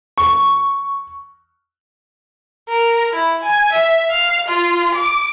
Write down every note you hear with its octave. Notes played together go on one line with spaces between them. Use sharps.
C#6
A#4
E4
G#5
E5
F5
F4
D6